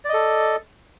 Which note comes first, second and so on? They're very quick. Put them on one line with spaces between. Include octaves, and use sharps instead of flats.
D5 D#5 A4